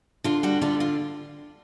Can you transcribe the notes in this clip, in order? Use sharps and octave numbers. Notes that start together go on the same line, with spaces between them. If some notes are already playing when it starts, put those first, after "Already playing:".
D3 F4
G3 F#4
D3 F4
F4